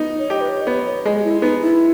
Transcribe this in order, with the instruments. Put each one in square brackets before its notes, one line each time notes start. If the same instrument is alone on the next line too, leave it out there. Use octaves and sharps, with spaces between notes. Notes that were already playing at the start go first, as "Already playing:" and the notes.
Already playing: [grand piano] B3 D#4
[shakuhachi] C#5
[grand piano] G4 [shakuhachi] D#5
[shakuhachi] B4
C#5
D#5
[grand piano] B3 [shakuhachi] C#5
[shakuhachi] C#5
[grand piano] G#3 [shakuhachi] D#5
[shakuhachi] G4
E4
[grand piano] B3 [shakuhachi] D#4
[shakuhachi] E4